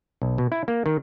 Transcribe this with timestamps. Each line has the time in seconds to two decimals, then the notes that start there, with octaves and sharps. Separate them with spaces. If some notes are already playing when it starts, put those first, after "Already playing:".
0.22 B1
0.38 B2
0.52 E4
0.68 A#3
0.86 D#3